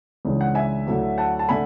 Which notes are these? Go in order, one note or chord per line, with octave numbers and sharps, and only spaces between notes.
C#2 C#3 E3 G#3 D4
F#5
E5 G#5
D2 D3 F#3 A3 E4
F#5 A5
A5
D3 A3 D4 G#5 B5